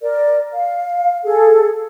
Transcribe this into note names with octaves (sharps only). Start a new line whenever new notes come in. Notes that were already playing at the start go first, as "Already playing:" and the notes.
A#4 D5
F5
G#4 A4